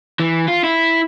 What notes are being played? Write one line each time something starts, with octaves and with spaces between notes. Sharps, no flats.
E3
F4
E4